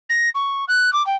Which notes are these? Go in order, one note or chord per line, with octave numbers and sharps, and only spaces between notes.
A#6
C#6
F#6
D6
G5